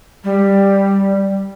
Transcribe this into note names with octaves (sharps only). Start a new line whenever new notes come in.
G3